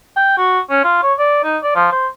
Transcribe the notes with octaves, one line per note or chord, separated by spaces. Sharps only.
G5
F#4
C#4
F4
C#5
D5
D#4
D5
F3
C5